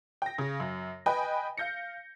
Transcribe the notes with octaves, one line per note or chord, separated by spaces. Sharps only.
G5 A#6
C#3
F#2
B4 D#5 G5 G#5 B5
F5 G6 A#6 C#7